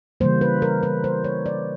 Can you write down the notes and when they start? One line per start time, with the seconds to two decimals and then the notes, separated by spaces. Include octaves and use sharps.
0.21 C#3 E3 G3 A#3 C5
0.41 B4
0.62 A#4
0.83 B4
1.04 C5
1.24 C#5
1.46 D5